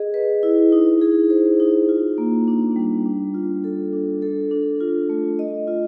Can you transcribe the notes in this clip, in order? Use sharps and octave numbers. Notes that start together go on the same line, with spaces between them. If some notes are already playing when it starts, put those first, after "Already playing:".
Already playing: G#4 D#5
B4
E4
D#4
G#4
C5
D#4
F4
A#3
D4
G3
D4
F4
A4
D4
A4
D4
F4
A3
D#5
F4